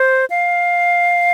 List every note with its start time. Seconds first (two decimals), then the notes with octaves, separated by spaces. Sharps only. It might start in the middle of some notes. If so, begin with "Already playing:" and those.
Already playing: C5
0.30 F5